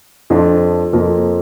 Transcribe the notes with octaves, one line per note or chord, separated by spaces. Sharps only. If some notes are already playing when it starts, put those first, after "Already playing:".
F2 F3 D4 F4
F2 F3 A#3